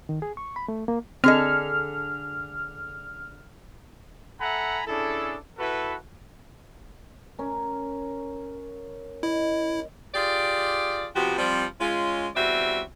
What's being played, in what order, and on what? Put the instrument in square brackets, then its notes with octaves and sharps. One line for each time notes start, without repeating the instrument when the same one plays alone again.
[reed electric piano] D#3
G#4
C#6
B5
A3
A#3
[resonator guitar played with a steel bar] D3 G#4 A4 [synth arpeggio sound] C4 D#5 [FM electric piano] F6
[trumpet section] A4 E5 F#5 G#5 A#5 B5
C#4 D4 E4 G#4 A4
E4 F#4 A4 B4
[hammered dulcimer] C#4 A#4
[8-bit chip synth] E4 [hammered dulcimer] D#5
[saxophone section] F4 G4 G#4 D5
C3 F3 B3 F#4 G4
F3 G3 C4
G#3 C#4 F4
E2 G3 C4 F#4 D5 E5